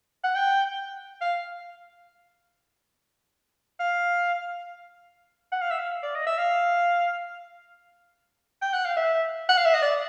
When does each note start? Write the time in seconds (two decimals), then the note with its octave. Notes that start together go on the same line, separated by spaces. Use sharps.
0.24 F#5
0.35 G5
1.21 F5
3.80 F5
5.52 F#5
5.61 F5
5.70 E5
5.79 F5
6.03 D5
6.15 D#5
6.27 E5
6.38 F5
8.62 G5
8.73 F#5
8.85 F5
8.97 E5
9.49 F#5
9.58 F5
9.65 E5
9.74 D#5
9.82 D5